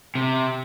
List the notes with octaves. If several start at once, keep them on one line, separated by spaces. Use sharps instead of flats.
C3